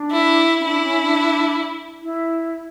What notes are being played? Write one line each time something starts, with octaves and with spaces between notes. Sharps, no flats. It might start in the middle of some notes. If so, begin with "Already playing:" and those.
Already playing: D4
E4
C#4
D4 E4
C#4
D4
E4